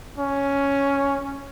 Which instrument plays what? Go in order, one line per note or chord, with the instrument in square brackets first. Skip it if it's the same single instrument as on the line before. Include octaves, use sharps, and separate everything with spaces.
[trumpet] C#4